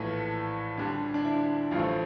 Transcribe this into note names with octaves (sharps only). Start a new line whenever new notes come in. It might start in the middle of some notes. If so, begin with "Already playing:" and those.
Already playing: A#1 A2 E3 A3
D2 D3 G3 D4
D4
E4
A1 G2 F3 A3 F4